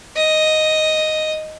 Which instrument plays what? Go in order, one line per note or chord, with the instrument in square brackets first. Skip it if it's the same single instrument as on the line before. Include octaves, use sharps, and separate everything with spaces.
[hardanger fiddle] D#5